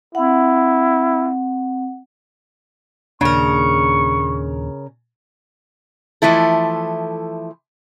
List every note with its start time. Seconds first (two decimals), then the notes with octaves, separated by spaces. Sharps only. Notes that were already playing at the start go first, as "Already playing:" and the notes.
0.15 C4 E4 F#5
3.21 D#2 A#2 C#3 D4 A#4 C#6
6.22 E3 F3 A3 E4 A4